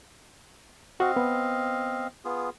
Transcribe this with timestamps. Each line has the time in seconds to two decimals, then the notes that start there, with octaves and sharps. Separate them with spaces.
1.00 C4 F#4 D#5 F5
1.16 B3
2.25 B3 F4 G#4